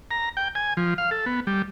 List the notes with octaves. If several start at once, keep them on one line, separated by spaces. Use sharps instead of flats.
A#5
G5
G#5
F3
F5
A4
B3
G3